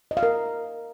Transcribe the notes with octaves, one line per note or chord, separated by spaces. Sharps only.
D#5
F5
A#4